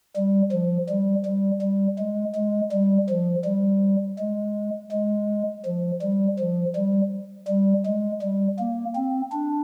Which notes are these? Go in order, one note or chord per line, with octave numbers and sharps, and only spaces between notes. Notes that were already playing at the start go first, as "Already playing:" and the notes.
G3
F3
G3
G3
G3
G#3
G#3
G3
F3
G3
G#3
G#3
F3
G3
F3
G3
G3
G#3
G3
A#3
C4
D4